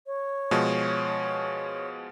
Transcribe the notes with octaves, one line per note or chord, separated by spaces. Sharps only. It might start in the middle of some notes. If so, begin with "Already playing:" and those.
C#5
B2 F3 G#3